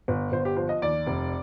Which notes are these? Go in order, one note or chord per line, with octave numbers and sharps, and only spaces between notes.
G1
G1 C5
G4
F3 C5
D#5
D#2 D5
F1